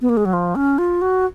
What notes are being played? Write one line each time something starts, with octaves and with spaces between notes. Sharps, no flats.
B3
A#3
G#3
F#3
F3
C#4
F4
F#4